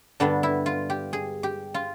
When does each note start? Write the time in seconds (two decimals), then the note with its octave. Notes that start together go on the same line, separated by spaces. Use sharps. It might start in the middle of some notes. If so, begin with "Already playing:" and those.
0.20 G2 D3 G3 B3 D4
0.43 E4
0.66 F4
0.90 G4
1.13 G#4
1.43 G4
1.74 F4